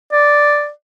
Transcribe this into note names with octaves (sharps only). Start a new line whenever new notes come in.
D5